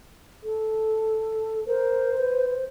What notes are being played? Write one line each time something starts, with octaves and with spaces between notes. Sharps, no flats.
A4
A#4 C5
B4